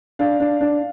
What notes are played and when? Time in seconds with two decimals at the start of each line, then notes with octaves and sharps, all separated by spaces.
0.19 D4 F5
0.40 D4
0.61 D4